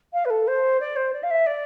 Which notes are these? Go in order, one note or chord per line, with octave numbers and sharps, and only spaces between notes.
F5
B4
A4
C5
D5
C5
D5
F5
E5
D5